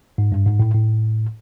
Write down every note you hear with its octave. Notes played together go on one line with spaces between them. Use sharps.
G#2
G2
G#2
A2
A2